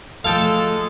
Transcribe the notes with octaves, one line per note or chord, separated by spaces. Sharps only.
F3 G#3 A3 A4 F5 G5